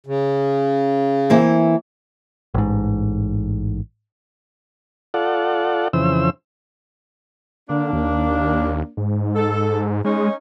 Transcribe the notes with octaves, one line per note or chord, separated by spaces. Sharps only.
C#3
E3 A#3 C4
A1 G#2
F4 A4 D5 F#5
F2 C#3 E3 C5 E6
D3 A#3 D4
D#2
G#2
A4
G#3 C#4 D#4